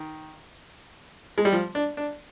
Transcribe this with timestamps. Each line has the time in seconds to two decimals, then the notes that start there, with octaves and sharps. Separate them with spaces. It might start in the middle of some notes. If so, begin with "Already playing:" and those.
Already playing: D#3
1.38 G#3
1.45 G3
1.53 F3
1.75 D4
1.97 D4